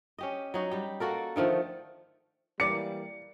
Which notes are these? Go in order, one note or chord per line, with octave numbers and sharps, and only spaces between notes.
C#4 G4 D#5
F#3 D#4 F#4
G3 G4
A#3 F#4 A4 A#4
D3 D#3 F3 A3
E3 G3 A#3 A#4 D5 C#7